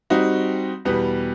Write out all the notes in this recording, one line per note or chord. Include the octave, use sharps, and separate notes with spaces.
G3 C4 D#4 F#4
E2 B2 G3 B3